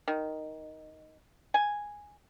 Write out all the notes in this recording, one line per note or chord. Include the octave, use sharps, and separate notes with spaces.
D#3
G#5